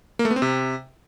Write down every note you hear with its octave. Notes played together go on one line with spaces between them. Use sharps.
A#3
A3
B3
C4
C3